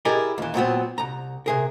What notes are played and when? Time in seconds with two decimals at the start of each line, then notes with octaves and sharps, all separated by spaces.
0.05 E4 G4 G#4 A#4 D5 D#5
0.38 D#2 E3
0.54 A#2 F#3 B3 C4
0.98 C2 A#5
1.46 C3 G#4 A#4